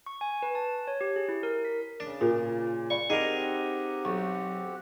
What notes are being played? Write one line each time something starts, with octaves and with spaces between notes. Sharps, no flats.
C#6
G#5
B4
A5
C#5
G4
G#4
E4
A#4
B6
C#3 D4
A#2 F4 G#4 A#4
D5 F5 B5 C#6
C4 D#4 G4 G#4 A#4 F#5
B1 C#6